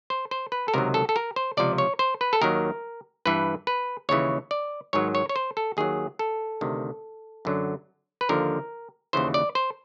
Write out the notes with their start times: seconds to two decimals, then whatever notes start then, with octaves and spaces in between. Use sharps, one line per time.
0.10 C5
0.31 C5
0.52 B4
0.68 A4
0.74 C#2 C3 D#3 F#3 A#4
0.94 A4
1.09 A4
1.16 A#4
1.36 C5
1.57 C#2 C3 F3 D5
1.78 C#5
1.99 C5
2.21 B4
2.33 A4
2.41 D#2 D#3 F#3 A#4
3.26 G2 E3 B4
3.67 B4
4.09 D#2 C#3 E3 C#5
4.51 D5
4.93 G#2 D#3 F#3 C#5
5.15 C#5
5.29 C#5
5.36 C5
5.57 A4
5.77 D#2 D#3 F#3 G#4
6.19 A4
6.61 D2 C3 D#3
7.45 F#2 D3 F#3
8.21 B4
8.29 D#2 D3 F3 A#4
9.13 D#2 C#3 E3 C5
9.34 D5
9.55 C5